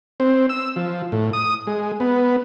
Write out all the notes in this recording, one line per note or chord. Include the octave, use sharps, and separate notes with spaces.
C4
E6
F3
A2
D#6
G#3
B3